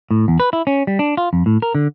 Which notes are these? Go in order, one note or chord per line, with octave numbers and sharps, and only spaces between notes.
A2
E2
B4
E4
C#4
G3
D4
F4
F2
A2
A#4
D3